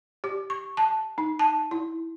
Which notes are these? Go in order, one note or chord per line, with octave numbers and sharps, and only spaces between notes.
G4
C#6
A5
D#4
A5
E4